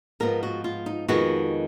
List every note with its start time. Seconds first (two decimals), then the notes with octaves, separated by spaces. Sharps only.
0.20 G#2 F3 B3 A#4
0.43 F#4
0.64 F4
0.86 D#4
1.08 F2 D#3 G#3 B3 F#4